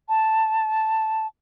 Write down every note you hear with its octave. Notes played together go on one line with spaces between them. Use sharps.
A5